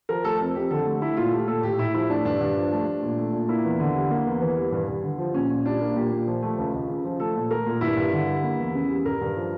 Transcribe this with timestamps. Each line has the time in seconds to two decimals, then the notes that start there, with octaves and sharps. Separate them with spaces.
0.09 F3 A#4
0.24 A3 A4
0.40 F2
0.55 F2 G4
0.71 D3 A4
0.86 A3
1.01 A3 E4
1.17 A#2 F4
1.32 A3 G4
1.48 A#2 A4
1.63 A2 G4
1.79 A2 E4
1.94 F3 E4
2.10 A3 D4
2.25 G2 D4
2.41 G2
2.56 F3
2.72 A3
2.87 A3
3.03 A#2
3.18 A3
3.33 A#2
3.49 A#3 E4
3.64 E2
3.80 D3
3.95 G3
4.11 A#3
4.26 E2
4.41 E3
4.57 G3
4.72 G2
4.88 G2
5.03 D3
5.18 F3
5.34 A#2 C#4
5.50 A#2
5.65 G3 D4
5.81 A#3
5.96 A#2 G4
6.12 A#2
6.27 F3
6.42 A3
6.58 C#2
6.74 C#2
6.89 C#3
7.04 F3
7.20 A3 A4
7.35 A#2
7.51 A3 A#4
7.66 A#2
7.81 G2 E4
7.97 G2
8.13 D3
8.28 G3
8.44 A#3
8.59 E2
8.74 C#3
8.90 G3
9.05 G2 A#4
9.21 G2
9.36 F3